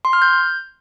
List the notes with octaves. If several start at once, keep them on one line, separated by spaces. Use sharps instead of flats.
C6
F6
G6